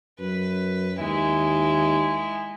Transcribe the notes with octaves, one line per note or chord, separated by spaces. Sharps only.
F#2 B4
D#2 G#3 E4